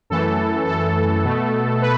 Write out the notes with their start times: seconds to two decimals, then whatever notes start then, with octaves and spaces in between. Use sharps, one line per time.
0.10 F#2 E3 A3 A4
0.67 A4
1.24 B2 A3
1.82 B4